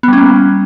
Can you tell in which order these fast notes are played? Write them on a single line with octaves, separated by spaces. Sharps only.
B3 G3 C#4 A#3